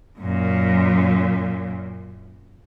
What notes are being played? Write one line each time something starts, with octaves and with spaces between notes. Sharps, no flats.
F#2 A#2